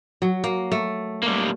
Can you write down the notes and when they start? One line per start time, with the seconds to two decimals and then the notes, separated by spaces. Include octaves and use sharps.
0.22 F#3
0.44 A#3
0.72 A3
1.23 G3 A#3